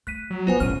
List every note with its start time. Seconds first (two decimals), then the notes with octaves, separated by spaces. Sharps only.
0.07 A3 F#6 B6 D#7
0.30 F#3
0.47 G1 B3 F4 C5 G#5
0.60 A1 E2 B2 C#4 F6 D#7